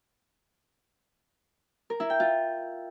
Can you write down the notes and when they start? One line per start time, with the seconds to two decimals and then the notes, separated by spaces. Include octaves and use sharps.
1.90 A#4
2.00 E4
2.10 G5
2.20 F4